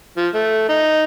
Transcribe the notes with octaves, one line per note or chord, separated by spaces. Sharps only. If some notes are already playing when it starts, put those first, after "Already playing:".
F3
A3
D#4